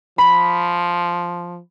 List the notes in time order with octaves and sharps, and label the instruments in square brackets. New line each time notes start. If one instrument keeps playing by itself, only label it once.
[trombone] F3 [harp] B5